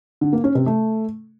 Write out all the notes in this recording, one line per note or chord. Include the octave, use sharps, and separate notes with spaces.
D3
A#3
C#4
C3
A3